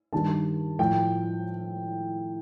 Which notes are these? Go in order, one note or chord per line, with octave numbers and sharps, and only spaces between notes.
G2 D#3 G3 A5
A2 F3 G5